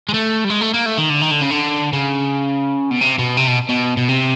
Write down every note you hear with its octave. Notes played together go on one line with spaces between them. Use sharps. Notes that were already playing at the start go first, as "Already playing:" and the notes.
G#3
A3
G3
G#3
A3
A#3
A3
D#3
D3
D#3
D3
C#3
D3
C#3
B2
C3
B2
C3
B2
B2
B2
C3